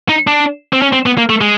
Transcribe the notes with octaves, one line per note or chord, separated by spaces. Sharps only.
D#4
D4
C4
C#4
C4
B3
A#3
A3
G#3